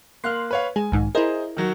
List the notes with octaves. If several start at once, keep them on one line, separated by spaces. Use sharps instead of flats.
A#3 F5 C6 F6 F#6
B4 C#5 F5
G#3 G#5
B1 G#2 D#3
E4 G#4 A#4 C5 D#5
D#3 F#3 F#4